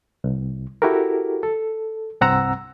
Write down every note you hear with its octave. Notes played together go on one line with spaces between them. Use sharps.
C2
E4 F#4 G4 A4 A#4
A4
C2 G2 C4 F#5 A#5 E6